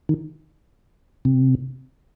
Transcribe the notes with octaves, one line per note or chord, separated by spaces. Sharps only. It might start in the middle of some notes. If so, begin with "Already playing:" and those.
D#3
C3